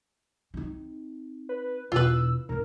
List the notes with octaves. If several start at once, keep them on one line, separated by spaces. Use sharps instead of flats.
C4 D#4
B4
E1 F4 B4 E6
G#2 C4 A#4